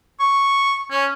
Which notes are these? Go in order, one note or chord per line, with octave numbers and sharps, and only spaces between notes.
C#6
C#4